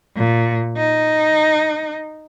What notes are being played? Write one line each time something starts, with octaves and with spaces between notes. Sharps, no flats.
A#2
D#4